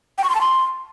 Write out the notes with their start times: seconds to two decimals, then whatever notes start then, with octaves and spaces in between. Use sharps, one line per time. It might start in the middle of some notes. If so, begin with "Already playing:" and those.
0.18 G5
0.24 C#6
0.30 C6
0.35 A5
0.41 C6